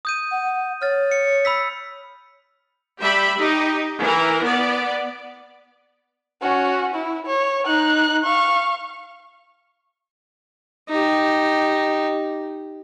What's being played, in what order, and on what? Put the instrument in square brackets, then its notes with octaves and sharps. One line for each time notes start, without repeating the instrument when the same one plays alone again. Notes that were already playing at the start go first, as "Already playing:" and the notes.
[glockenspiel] D#6 G6 D#7
[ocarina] F#5
[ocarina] C#5 [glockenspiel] F6 A6
[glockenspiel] C#7
B5 E6 B6
[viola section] G3 G4 E5 B5
D#4 G4
E3 A#4
B3 D5
[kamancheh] C#4 F#4
E4
C#5
D#4 F#6
F5 C#6
[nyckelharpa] D#4 G4